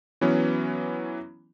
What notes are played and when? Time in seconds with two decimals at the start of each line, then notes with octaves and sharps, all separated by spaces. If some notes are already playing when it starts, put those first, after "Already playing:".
0.21 E3 F#3 B3 C#4